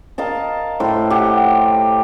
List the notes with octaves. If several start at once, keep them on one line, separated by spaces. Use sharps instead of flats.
A#4 D#5 F5 A5
A2 C5
G4 F#5